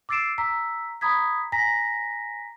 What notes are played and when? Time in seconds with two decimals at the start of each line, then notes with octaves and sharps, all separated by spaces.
0.09 D6 E6 A6 C7 D7 E7
0.38 A#5 E6 B6
1.01 A#5 B5 D#6 G#6 B6
1.52 G#5 A#5 A#6 B6